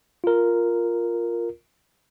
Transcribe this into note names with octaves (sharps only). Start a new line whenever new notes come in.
F4 A#4